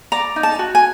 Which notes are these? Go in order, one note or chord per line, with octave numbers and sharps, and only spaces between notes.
D5 A#5
D#4
A5
F#4
G#5